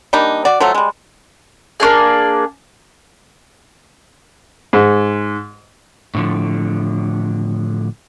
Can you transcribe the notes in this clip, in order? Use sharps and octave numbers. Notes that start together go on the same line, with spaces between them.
G3 A#3 D4 D#4
F#4 D5
F3 F#3 A3
G3 G#3
A#3 C#4 D4 G#4
G#2
A2 D3 F3